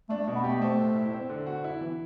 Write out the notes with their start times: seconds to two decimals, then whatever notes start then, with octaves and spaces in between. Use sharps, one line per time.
0.09 A3 D4
0.23 A3
0.28 B2
0.36 B3
0.44 A3 G4
0.61 A3 C4
0.78 A2
0.96 E4
1.13 C4
1.29 D3
1.46 F#4
1.64 E4
1.81 E3